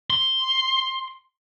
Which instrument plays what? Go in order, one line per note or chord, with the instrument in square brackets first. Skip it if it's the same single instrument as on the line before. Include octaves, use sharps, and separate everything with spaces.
[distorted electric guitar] C6